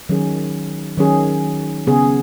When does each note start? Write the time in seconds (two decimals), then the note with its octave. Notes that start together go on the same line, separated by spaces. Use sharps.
0.09 D#3 F#3 C#4 G#4
0.98 D#3 F#3 C#4 G#4
1.87 C#3 B3 G#4